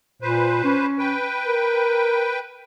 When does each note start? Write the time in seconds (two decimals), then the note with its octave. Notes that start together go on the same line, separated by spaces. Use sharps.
0.22 A#2 B4 C5
0.64 C#4
0.99 B4 G5
1.46 A#4